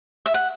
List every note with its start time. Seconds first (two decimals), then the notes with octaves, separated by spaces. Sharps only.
0.26 E5
0.34 F#5